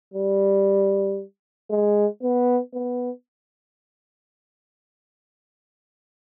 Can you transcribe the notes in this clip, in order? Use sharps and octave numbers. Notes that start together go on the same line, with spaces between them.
G3
G#3
B3
B3